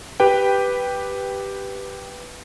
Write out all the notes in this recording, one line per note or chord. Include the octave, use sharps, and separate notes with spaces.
G4 B4 G5